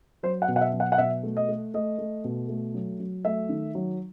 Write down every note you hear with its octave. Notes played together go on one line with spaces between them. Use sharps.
F#3 C5
F#5
B2
F#5
E5
F#3
F#5
F#5
B2 E5
A3
D#5
A3
A3 D#5
A3
B2
A3
F#3
F#3
A3 E5
D#3
F#3